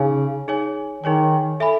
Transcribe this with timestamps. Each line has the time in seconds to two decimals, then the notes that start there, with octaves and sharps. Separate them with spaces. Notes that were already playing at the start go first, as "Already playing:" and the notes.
Already playing: C#3 D#4 G#4 C#5 G#5
0.48 D#4 G#4 C#5 G#5
1.03 D#3 D#4 G#4 C#5 G#5
1.60 A4 E5 G#5 B5